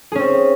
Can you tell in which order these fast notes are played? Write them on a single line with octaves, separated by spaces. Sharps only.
G#4 C#4 C4